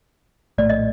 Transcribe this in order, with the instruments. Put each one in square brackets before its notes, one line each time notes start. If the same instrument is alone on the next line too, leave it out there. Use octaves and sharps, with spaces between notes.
[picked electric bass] A#1 A2 A3 [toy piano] D5
[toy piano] D#5